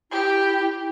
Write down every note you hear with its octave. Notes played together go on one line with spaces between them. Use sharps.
E4 G4